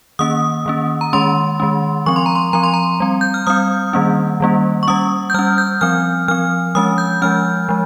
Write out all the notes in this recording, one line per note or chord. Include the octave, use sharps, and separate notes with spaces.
D#3 A#3 C#4 D#6
D#3 A#3 C#4
A#5
D#3 G#3 C#4 C6
D#3 G#3 C#4
F3 C4 C#6
C6
A#5
C6
F3 C4 A#5
C6
A#5
G3 C4
G6
F6
G3 C4 D#6
D#3 G3 A#3 C#4
D#3 G3 A#3 C#4
C#6
G3 C#4 D#6
G6
G3 C#4 F6
G6
F3 C4 F6
F3 C4 F6
F3 G#3 C#4 D#6
G6
F3 G#3 C#4 F6
F3 G#3